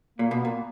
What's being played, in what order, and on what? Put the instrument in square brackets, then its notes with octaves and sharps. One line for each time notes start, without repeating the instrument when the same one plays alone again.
[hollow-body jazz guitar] A#2 [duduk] A#3
[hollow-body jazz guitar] B2 [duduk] B3
[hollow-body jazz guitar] A#2 [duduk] A#3